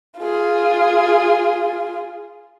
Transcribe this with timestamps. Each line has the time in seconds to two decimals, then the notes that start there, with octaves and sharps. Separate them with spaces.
0.18 F4 G#4